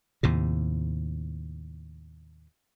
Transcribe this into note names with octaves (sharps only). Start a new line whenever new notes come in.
D#2 A2 C3